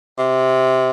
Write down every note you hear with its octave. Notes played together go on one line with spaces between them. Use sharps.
C3